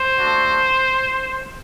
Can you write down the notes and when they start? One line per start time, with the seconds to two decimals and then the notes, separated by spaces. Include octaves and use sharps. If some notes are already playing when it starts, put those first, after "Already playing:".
Already playing: C5
0.17 A3 D4 F#4